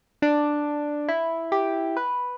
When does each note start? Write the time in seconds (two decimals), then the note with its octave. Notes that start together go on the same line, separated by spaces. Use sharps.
0.22 D4
1.08 E4
1.52 G4
1.97 B4